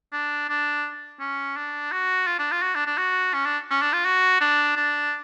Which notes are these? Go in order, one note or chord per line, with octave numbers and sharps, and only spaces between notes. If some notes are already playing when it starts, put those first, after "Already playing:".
D4
D4
C#4
D4
F#4
F4
D4
F4
F#4
D4
D4
F#4
C#4
D4
C#4
D4
F4
F#4
D4
D4